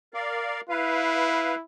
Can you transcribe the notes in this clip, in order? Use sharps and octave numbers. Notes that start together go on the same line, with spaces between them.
A#4 D5 F5
E4 B4 F5